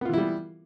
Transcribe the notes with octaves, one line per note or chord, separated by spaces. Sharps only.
E3 G3 B3 E4 F4